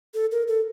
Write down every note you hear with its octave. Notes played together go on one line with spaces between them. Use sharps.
A4
A#4
A4